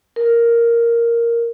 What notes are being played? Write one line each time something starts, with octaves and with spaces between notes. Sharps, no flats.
A#4